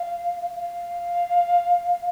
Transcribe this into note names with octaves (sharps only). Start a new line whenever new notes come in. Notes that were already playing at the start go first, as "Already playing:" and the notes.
Already playing: F5
F5